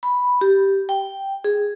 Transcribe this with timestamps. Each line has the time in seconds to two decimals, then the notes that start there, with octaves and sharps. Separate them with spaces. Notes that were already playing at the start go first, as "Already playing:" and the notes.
0.03 B5
0.41 G4
0.89 G5
1.44 G#4